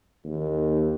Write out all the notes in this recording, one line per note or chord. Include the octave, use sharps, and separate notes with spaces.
D#2